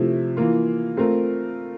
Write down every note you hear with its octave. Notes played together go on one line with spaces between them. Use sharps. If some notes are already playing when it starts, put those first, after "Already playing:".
Already playing: C3 F3 A3 E4
E3 A#3 F4
A3 C4 F4 A#4